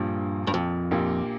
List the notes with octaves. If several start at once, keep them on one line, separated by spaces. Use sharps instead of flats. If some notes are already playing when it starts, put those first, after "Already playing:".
Already playing: A#1 G2 A#2 F3 A#3
G2
F2
A#1 A#2 A#3 G4